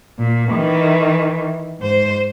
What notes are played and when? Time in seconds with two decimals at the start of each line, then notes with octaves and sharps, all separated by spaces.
0.19 A#2
0.52 D#3 E3
1.79 G#2 C5